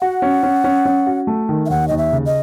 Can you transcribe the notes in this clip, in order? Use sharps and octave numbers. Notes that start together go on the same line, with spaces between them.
F#4 F#5
C#4
C#4
C#4
C#4
F#4
A3
D#3
E5
D#2 F#5
D#2 D#5
E5
C#3
D#5